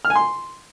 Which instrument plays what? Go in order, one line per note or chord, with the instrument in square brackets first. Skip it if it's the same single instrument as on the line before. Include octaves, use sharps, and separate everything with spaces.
[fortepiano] F6
G#5
C6